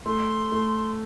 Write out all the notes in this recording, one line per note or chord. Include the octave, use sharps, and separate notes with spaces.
A3 C6
A3